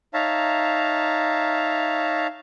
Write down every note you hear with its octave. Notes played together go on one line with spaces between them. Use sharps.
D#4 C#5 E5 F5 A5 A#5